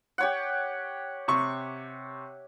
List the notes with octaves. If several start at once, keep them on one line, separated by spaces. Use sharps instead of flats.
G4 C#5 F#5
C3 C#6